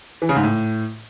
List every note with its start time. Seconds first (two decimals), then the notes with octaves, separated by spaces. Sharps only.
0.22 E3
0.29 C#3
0.36 G#2
0.43 A2